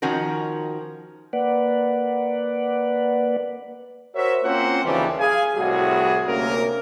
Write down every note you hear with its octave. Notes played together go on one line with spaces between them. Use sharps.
D#3 F3 C#4 F#4 A#4
A#3 B4 D5 F#5
F#4 A#4 C5 C#5 E5
A#3 C4 C#4 F4 C5 F#5
D#2 C#3 E3 F3 G3
G#4 F5 G#5
C2 A2 G3 F#4 G#4
D2 C3 A#3 C#4 A#4